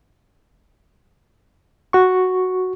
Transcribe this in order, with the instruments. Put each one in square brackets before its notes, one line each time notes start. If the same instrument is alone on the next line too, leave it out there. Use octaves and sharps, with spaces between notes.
[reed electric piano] F#4 C#6